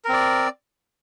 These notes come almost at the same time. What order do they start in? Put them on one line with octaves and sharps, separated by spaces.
A#4 C4 D5